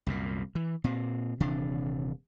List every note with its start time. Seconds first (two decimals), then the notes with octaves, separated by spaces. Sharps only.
0.07 C2 F#2 A#2
0.55 E3
0.84 A#2 C4
1.40 D#1 C3 E3 D4